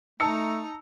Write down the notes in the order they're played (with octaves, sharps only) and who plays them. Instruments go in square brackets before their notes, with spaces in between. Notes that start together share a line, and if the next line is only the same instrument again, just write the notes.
[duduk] A3 [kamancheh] D#4 A#5 [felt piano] A5 E6 C#7